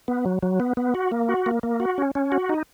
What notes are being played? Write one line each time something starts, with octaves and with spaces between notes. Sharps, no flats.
B3
F#3
F#3
B3
B3
F#4
A#3
F#4
A#3
A#3
F#4
C#4
C#4
F#4
D#4